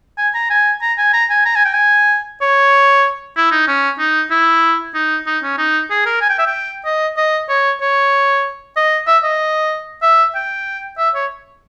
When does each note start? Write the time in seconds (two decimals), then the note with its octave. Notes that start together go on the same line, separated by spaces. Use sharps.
0.18 G#5
0.34 A#5
0.50 G#5
0.82 A#5
0.98 G#5
1.13 A#5
1.30 G#5
1.45 A#5
1.55 G#5
1.65 G5
1.74 G#5
2.41 C#5
3.36 E4
3.51 D#4
3.67 C#4
3.99 D#4
4.31 E4
4.94 D#4
5.26 D#4
5.43 C#4
5.58 D#4
5.90 G#4
6.06 A#4
6.21 G#5
6.29 G5
6.38 E5
6.46 G5
6.85 D#5
7.17 D#5
7.49 C#5
7.81 C#5
8.76 D#5
9.07 E5
9.23 D#5
10.02 E5
10.35 G5
10.98 E5
11.15 C#5